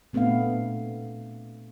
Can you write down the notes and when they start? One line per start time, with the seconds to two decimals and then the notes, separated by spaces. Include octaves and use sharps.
0.13 A#2 A3 B3 C4 D4 F5